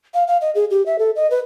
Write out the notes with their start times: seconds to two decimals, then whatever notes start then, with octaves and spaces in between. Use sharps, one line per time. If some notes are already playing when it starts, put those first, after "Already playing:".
0.14 F5
0.28 F5
0.41 D#5
0.55 G#4
0.71 G4
0.86 E5
0.99 A4
1.16 D#5
1.30 B4